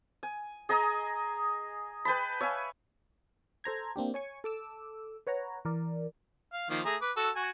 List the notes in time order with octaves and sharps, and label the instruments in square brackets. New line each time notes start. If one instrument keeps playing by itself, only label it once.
[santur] G#5
G#4 D#5 G#5 A#5
B4 G5 A5 B5
C#5 E5 F5 G#5
[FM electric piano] A4 C5 A#5 G#6
A#3 C4 D4 G4
C#5 G#5 C#6
A4 D6 E6
B4 C#5 F#5 A#5
E3 A#4 D5
[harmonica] F5
D#3 F3 A#3
A3 G#4 A#5
B4 D6
F#4 A4
F#4 G#5